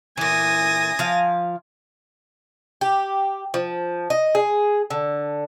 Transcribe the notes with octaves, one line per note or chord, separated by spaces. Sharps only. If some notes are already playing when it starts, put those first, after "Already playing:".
A#2 E3 G#5 D#6 A#6
F3 F5
G4
F3
D#5
G#4
D3